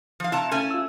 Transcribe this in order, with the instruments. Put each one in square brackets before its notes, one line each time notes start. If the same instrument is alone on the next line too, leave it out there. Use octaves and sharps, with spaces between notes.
[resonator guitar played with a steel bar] F3 F5
[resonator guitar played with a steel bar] C3 A5 A#5 [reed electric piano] E4 F5
[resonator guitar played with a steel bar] A3 C#4 G#5
[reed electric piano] F4 E6